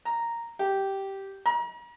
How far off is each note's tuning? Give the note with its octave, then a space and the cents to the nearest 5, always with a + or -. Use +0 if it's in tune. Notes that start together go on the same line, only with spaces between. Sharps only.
A#5 -5
G4 -10
A#5 +40